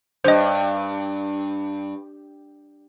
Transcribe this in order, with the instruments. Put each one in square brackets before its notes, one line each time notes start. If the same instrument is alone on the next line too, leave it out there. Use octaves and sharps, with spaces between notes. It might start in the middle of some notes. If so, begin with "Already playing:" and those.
[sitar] G2 [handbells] C5 D#5